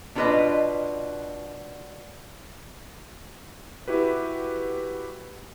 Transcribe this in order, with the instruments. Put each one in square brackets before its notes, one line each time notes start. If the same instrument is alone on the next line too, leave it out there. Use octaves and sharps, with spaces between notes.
[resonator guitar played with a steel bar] B2 D4 F4 G#4 B4 D#5
[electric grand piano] E4 F#4 G4 B4